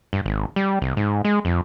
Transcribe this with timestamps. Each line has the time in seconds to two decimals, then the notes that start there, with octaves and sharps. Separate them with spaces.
0.13 G2
0.26 G#1
0.56 G3
0.82 C2
0.97 G#2
1.25 G#3
1.45 F2